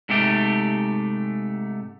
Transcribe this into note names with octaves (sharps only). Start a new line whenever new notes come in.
G#2 C3 A3 G4